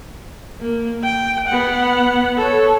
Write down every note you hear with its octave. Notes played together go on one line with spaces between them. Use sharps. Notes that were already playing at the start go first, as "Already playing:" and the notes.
A#3
G5
B3 F#5
A4 C#5